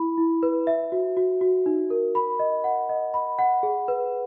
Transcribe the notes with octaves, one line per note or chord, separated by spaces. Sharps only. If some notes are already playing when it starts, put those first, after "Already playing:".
Already playing: E4 B5
E4
B4
E5
F#4
F#4
F#4
D#4
A#4
B5
D#5
F#5
D#5
B5
F#5
G#4
B4